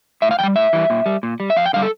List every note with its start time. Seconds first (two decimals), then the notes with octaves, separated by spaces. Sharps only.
0.22 A2 E5
0.31 F5
0.39 E3 G5
0.43 G3
0.56 A2 E5
0.73 E3 G3
0.90 A#2
1.06 G3
1.23 A#2
1.40 G3
1.50 E5
1.56 F2 F5
1.66 G5
1.73 D3 G3 F5
1.82 A4